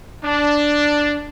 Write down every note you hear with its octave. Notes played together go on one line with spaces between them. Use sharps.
D4